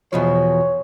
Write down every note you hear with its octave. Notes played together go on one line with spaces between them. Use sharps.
E2 B2 F3 C#5